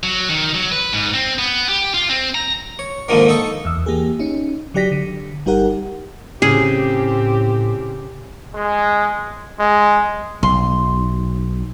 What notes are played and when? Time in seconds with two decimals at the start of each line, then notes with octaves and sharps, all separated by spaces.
0.03 F#3
0.29 D#3
0.54 F#3
0.72 B4
0.93 G#2
1.14 C4
1.39 B3
1.69 G4
1.94 F4
2.09 C4
2.35 A#5
2.79 C#5
3.09 G#2 D3 D#3 F3 A#3
3.28 D#4 A4 C#6
3.65 E2 E6
3.86 E3 A#3 G4 G#4
4.19 C#4 D#4
4.74 D3 F#3 G4 D5 A#6 B6
4.92 D3
5.45 G1 G3 D#4 G4 A#4 F#5
6.42 A2 C#3 C4 G4 G#4
8.54 G#3
9.60 G#3
10.43 B1 C6